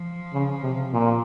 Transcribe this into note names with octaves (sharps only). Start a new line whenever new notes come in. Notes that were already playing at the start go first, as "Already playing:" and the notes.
Already playing: F3
C#3
C3
A#2